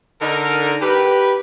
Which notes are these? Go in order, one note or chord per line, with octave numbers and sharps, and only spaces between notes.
D3 D#4 A#4
G4 B4